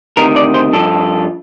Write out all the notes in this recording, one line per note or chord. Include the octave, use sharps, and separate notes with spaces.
D2 C3 D#3 A#4
D5
C5
G2 F3 A4